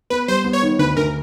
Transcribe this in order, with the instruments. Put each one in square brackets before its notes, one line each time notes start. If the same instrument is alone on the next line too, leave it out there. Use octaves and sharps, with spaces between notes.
[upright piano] B3 [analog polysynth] B4
[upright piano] G3 [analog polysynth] C5
[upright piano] B3
[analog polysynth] C#5
[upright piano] D#3
[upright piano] D2 [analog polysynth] B4
[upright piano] D2 [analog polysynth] A#4